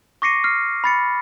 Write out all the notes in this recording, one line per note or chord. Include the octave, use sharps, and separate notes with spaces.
C#6 D6 A#6 C7 C#7 D#7
F6 C7
B5 A6 C#7